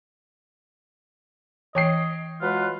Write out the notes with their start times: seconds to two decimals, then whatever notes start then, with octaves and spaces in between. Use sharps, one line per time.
1.75 E3 C#5 D#5 G5 C7
2.41 F#3 G#3 F4 B4